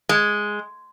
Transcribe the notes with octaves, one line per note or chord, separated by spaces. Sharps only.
G#3